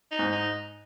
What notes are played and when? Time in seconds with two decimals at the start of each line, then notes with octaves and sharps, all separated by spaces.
0.11 D#4
0.19 G#2
0.32 D#4